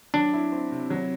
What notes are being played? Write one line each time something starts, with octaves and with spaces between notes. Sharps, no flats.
F#3 D4
E4
C4
C3
F#3